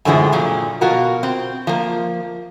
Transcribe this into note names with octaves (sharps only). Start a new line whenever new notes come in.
F#2 A2 D3 E3 F3 G#3
A#2 F3 F#3
B2 F4 F#4 A#4
C4
F3 A#3